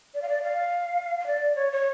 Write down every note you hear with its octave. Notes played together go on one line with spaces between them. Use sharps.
D5
F5
D5
F5
F5
D5
C#5
C#5